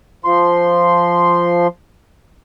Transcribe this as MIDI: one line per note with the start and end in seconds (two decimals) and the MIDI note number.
0.25 1.67 53
0.25 1.67 84